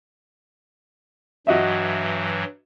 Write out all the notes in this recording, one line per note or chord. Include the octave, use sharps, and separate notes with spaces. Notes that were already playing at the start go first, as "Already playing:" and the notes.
G2 E3 F#3 F#4 D#5 E5